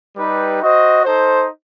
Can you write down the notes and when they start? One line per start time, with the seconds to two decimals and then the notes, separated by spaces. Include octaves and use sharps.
0.16 G3 D#4 G4 B4
0.60 F#4 C5 D#5
1.04 D#4 A4 C5